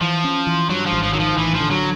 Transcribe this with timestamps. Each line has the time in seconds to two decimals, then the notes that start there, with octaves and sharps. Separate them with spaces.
0.01 E3 F3
0.24 C#4
0.47 E3
0.69 G2 F#3
0.86 F3
0.92 G#1
1.03 F3
1.13 D#3 F#3
1.20 F3
1.37 A1 E3
1.55 F3
1.60 D3
1.71 F#3